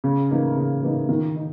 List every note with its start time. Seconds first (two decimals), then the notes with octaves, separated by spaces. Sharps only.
0.04 C#3
0.30 E3 A#3 D#4
0.57 C#3
0.82 E3 A#3 D#4
1.09 D#3
1.35 D#4